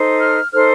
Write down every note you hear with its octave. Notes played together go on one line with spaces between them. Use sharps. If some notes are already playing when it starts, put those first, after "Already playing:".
Already playing: D#4 A4 C5
F6
D#4 A4 C5 F6